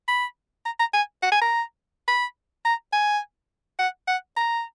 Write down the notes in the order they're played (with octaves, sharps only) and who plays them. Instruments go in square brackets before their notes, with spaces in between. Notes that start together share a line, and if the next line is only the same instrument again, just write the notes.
[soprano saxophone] B5
A#5
A#5
G#5
F#5
G#5
A#5
B5
A#5
G#5
F#5
F#5
A#5